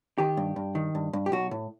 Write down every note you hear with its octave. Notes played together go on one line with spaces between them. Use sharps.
D#3 G4
G2
G2
D#3
G2
G2
G4
B1 F#4
A2